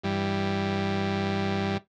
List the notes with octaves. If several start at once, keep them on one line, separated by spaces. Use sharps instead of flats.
G2 E3 G3